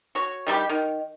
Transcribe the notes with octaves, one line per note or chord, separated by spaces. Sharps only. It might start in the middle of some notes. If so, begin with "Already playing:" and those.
F#4 C#5
D#3 G3 E4 G4
D#3